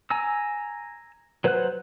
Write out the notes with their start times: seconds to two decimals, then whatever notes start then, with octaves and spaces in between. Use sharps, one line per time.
0.10 G#5 A#5 E6
1.44 F#3 B4 C5 F#5 F#6